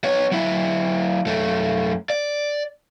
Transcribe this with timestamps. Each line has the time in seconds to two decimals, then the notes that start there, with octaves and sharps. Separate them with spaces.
0.04 B3 C#5
0.32 F#3 E4
1.26 F#2 A3
2.10 D5